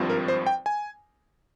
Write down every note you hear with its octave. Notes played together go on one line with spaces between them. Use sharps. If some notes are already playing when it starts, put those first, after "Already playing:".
Already playing: G#1 G2 F3 C4
A#4
C5
G5
G#5